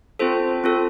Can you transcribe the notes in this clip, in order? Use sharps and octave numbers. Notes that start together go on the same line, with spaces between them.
C4 F4 A4 C5
C4 F4 A4